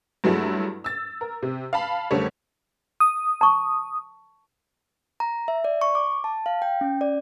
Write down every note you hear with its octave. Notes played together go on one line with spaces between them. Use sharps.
G2 F#3 G#3 A3 E4
E6 A6
A#4
C3
F5 A5 B5
F#1 D3 G3 A3 C#5
D#6
A5 C#6
A#5
E5
D5
C#6
D6
A5
F5
G5
C#4
D5